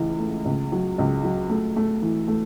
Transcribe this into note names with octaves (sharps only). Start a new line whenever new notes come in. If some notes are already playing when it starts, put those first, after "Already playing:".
Already playing: C#2 E3 A3
A3
C#2
F#3
C#2
F#3
A3
A3
E3
A3